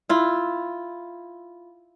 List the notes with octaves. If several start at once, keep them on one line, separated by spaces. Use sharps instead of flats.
E4 F4